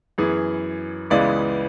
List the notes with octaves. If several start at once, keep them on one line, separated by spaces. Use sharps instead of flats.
F#2 E3 B3 G#4
C#2 C#3 E3 G#3 B3 D5